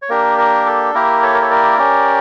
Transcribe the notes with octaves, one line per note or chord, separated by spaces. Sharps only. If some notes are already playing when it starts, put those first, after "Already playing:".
C#5
A#3 D4 G4 A#4
A#4
A4
A#3 E4 G4 A#4
A4 C#5
A#4
C#5
A#4 D5
C#4 G4